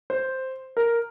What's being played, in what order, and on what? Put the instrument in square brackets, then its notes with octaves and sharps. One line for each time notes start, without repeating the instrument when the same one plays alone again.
[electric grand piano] C5
A#4